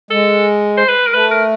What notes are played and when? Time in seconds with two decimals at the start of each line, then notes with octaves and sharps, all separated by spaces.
0.11 G#3 A4
0.77 C5
0.88 B4
1.07 A#4
1.14 A3 B4
1.31 A#4